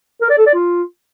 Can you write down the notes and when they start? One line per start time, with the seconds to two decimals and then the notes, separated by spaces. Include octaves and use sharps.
0.21 A#4
0.30 D5
0.38 A4
0.46 D5
0.54 F4